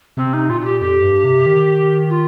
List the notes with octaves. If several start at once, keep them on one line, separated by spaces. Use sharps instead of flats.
C3 C4
D#4
A#2 F4
F4
G4
F2 G4
G2
C3
D#3
F4